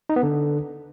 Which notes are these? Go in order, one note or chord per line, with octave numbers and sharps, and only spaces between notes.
D#4
B3
D3